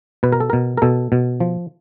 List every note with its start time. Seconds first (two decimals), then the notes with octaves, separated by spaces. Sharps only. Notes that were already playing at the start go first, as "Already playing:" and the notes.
0.23 B2 B4
0.32 A#4
0.40 A4
0.50 B2 A#4
0.77 A#4
0.82 B2 A4
1.12 B2
1.40 F3